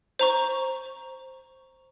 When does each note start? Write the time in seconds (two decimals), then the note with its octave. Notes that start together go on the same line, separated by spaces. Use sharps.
0.19 C5 A#5 C#6